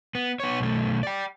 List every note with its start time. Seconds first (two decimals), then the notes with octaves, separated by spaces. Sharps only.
0.15 B3
0.40 B3 C#5
0.60 B1 A3
1.03 D5 G5